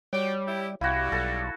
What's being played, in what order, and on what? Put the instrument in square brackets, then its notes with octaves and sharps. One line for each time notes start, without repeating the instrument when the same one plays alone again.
[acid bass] G3 [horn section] F#4 D5 G5 [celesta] C#5
[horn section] E4 G4
[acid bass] C2 [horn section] G3 [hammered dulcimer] E4 F#4 [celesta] F5 G#6
[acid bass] B1 [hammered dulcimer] A4